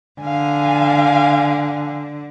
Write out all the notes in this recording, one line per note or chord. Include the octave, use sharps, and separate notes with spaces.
D3 F5 G#5